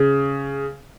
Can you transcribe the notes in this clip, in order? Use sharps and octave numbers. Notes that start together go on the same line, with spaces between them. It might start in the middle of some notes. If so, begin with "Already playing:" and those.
Already playing: C#3